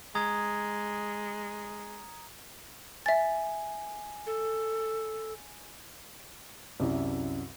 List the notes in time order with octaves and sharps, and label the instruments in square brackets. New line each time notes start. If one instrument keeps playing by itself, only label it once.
[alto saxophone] G#3 [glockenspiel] A#5 D#6 G#6
[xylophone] E5 A6 [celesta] G#5
[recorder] A4
[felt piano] C2 F#2 E4